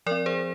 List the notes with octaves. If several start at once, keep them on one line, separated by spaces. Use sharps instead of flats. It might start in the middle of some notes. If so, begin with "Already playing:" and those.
F3 C4 A#4 D5
G#4 C5